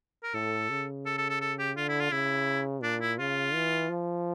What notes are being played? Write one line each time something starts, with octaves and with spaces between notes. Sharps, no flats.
A#4
A2 A4
C#3
A4
A4
A4
A4
G4
D3 F4
E4
F4
C#3 E4
A#2 D4
E4
C#3 F4
E3
F3